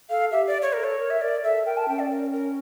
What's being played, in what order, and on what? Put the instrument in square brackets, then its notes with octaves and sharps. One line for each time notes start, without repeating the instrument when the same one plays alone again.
[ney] A4 [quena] F5
[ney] G4 [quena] E5
[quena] D5
C#5
[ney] A4 [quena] A#4
[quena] C#5
[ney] A#4
[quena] E5
[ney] A#4 [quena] D5
[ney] A4 [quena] E5
[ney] A#4 [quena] G5
[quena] A5
[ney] C#4 [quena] G5
[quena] D5
A#4
A#4